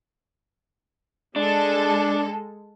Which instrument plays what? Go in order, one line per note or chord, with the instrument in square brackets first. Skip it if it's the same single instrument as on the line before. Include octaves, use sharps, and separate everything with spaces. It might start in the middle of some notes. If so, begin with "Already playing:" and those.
[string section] G#3 A4 [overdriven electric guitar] D4